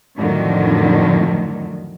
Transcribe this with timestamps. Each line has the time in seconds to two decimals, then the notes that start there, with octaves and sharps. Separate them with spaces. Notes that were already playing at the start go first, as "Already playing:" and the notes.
0.17 F2 A2 D3 D#3 F3 F#3